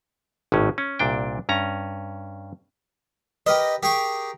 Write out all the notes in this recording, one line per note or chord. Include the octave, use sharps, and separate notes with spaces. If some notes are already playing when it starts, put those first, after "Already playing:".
G#1 A2 C#4
C#4
C2 A#2 D4 G5
G2 C#4 A#5
G4 A#4 B4 D#5
G4 G#4 A#4 C#6